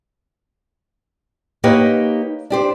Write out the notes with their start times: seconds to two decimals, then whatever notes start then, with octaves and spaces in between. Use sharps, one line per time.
1.64 A#3 D#4 G4 B4 C#5 F#5
2.50 D4 G4 C5